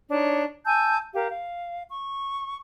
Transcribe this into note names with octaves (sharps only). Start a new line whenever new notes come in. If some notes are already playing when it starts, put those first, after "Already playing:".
D4 D#4 C#5
G#5 A5 E6 G6
G4 A#4 F5
F5
C#6